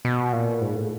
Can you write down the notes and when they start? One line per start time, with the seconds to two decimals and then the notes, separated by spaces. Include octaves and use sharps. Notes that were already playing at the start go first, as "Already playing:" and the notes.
0.05 B2
0.33 A#2
0.61 G#2
0.76 A2